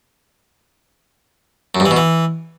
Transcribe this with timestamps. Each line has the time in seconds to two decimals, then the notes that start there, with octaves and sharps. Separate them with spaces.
1.75 F#2
1.80 G2
1.86 E3
1.91 B2
1.97 E3